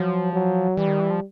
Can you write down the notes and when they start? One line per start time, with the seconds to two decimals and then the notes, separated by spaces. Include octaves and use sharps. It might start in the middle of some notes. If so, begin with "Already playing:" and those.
Already playing: F3 F#3
0.33 F#3
0.77 E3 G3
0.88 D#3
1.00 E3
1.10 F3